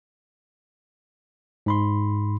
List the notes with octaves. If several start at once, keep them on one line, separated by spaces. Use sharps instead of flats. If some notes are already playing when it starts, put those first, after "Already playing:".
G#2 B5 C6